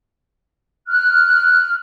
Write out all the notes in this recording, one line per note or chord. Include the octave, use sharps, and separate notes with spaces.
F6 F#6